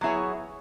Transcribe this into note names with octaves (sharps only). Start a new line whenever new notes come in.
F#3 B3 E4 G#4 C#5